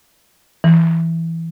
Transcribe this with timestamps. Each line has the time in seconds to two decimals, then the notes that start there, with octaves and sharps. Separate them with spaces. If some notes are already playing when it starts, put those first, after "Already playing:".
0.64 E3